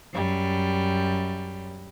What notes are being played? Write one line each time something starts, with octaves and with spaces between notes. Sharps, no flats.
F#2 G3